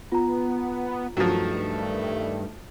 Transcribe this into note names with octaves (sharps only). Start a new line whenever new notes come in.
B3 F4 A#5
G2 D#3 F3 F#3 A3